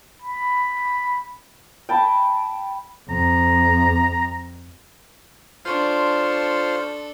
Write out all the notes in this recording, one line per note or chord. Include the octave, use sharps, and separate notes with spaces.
B5
G5 A5 B5
F2 A#5
D4 F4 A4 C5 C6 C#6